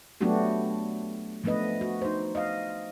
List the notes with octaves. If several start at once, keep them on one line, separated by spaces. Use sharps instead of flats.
F#3 A3 B3 D4 F#4 G4
F3 A3 B3 D4 B4 D#5
F#4
D#4 C5
D#5 F5